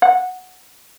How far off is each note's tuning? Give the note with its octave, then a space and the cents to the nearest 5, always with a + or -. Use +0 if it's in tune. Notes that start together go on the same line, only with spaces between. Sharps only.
F#5 -5